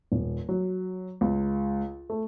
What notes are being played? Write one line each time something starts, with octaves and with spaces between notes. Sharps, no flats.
D#1
F#3
C#2
A3